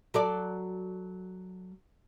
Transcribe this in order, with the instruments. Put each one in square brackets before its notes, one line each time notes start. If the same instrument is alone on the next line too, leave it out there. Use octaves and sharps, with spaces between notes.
[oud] F#3 A4 D5